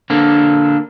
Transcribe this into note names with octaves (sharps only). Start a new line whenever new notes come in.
D3 A#3 D4